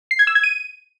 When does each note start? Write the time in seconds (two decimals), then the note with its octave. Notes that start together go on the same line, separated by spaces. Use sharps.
0.11 C7
0.19 G#6
0.27 E6
0.35 G#6
0.44 D#7